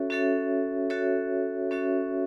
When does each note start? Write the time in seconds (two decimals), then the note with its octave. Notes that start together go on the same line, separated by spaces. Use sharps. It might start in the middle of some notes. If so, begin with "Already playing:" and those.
Already playing: C#4 F#4 A4 C#5 E5
0.10 C#4 F#4 A4 C#5 E5
0.90 C#4 F#4 A4 C#5 E5
1.71 C#4 F#4 A4 C#5 E5